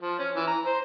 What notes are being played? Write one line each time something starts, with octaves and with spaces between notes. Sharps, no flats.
F3
C#4
E3
A#5
C5